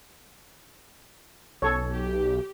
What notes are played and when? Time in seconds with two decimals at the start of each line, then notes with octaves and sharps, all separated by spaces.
1.62 B1 A4 C#5
1.93 G4